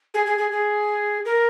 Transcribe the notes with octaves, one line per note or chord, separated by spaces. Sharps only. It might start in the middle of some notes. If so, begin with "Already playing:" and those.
G#4
G#4
G#4
G#4
A#4